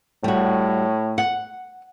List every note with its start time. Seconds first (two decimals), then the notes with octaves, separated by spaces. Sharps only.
0.24 A2 G3 F#4
1.18 F#5